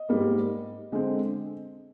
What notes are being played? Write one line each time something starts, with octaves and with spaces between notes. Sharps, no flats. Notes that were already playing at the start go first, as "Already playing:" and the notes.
Already playing: D#5
G#2 G3 A#3
D3 G#3 C4